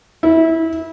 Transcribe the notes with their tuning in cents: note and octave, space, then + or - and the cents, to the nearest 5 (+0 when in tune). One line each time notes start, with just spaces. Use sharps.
E4 -20